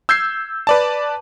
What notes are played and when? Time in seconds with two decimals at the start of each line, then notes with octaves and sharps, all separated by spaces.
0.09 E6 G6 G#6 C7
0.67 B4 D5 A5